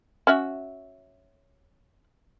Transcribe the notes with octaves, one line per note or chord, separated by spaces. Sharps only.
C#4 F#4 E5